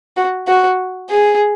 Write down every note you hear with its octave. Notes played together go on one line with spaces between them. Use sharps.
F#4
F#4
G#4